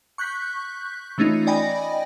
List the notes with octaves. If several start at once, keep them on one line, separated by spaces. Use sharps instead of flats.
C#6 F#6 G6 B6
E3 A3 C#4 D#4 F4
D5 D#5 G5 G#5 B5 A#6